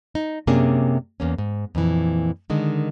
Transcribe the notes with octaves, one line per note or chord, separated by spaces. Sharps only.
D#4
F#2 C3 A#3 C#4 D4 G#4
E2 A#3 C#4
G#2
F2 A#2 E3
D3 D#3 G#3